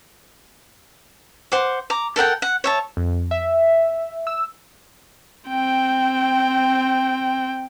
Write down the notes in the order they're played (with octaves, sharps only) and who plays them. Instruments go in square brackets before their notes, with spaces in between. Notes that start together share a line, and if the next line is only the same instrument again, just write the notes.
[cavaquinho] C5 F#5 D6
A#5 D6
A4 A#4 F#5 G5
F#5
C#5 E5 A5
[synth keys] F2
E5
E6
[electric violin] C4 G5